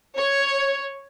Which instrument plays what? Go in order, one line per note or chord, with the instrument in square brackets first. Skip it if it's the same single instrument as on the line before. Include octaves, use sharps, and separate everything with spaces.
[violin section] C#5